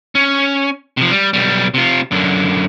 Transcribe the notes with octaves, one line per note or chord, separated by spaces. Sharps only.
C#4
C3 F3
G3
B1 G3
C3 F4
F#2 D3